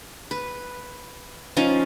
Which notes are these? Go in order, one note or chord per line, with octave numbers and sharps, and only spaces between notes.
B4
F3 C#4 D#4 F5